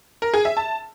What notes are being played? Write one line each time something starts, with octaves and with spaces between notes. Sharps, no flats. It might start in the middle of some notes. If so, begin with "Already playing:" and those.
A#4
G#4
E5
A5